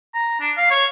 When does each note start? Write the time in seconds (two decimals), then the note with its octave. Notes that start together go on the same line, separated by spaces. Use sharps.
0.15 A#5
0.41 D4
0.57 F5
0.71 C#5